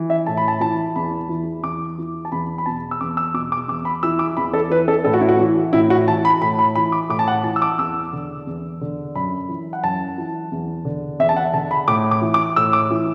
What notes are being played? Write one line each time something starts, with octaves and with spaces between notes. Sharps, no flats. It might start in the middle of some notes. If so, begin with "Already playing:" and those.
Already playing: E3
E5
A2 A5
B5
A5
E3 A5
E2 B5
E3
E2 D6
E3
A5
E2 B5
B5
B2 A5
E6
E2 D6
E6
B2 D6
D6
E2 D6
B5
E3 E6
D6
E2 B5
A4
E3 B4
A4
A2 A4
F#4
E4
F#4
E3
A2 E4
F#4
E3 A5
B5
A2 B5
B5
E3 B5
D6
A2 D6
A5
F#5
E3 A5
E6
D6
E2 E6
D3
E2
D3
F#2 B5
E3
F#5
F#2 A5
E3
E2
D3
E2 E5
A5
F#5
D3 A5
B5
A2 D6
D6
E3
D6
A2 E6
D6
E3